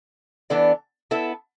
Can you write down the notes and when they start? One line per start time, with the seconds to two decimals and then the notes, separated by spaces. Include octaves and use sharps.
0.50 E3 B3 D4 A4 D5
1.11 B3 E4 A4 E5